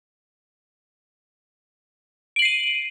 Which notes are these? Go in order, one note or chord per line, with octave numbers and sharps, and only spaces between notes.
C7 D7 D#7 F#7